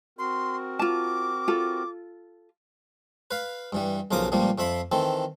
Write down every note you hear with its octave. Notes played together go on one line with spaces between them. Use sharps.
C4 F#4 A#4 C6
F4 A5 D6
F4 A4
B4 F5
G2 E3 G3
B1 C#3 F3 A#4 D6 D#6
C#2 A#2 F3 G3 A#3
F2 F3 E5 B5 C6
D#3 E3 C4 A4